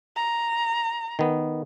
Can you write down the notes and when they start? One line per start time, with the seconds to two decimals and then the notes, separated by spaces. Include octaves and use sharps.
0.16 A#5
1.19 D#3 B3